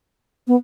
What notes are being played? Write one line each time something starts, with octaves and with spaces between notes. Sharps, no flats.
B3